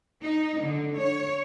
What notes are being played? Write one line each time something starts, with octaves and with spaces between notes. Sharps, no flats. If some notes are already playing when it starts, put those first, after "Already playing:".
D#4
D3
C#5